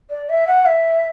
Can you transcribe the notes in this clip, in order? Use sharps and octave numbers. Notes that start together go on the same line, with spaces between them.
D5
E5
F#5
E5